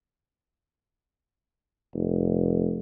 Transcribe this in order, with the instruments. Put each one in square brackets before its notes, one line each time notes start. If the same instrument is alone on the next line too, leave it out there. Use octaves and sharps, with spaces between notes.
[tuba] F1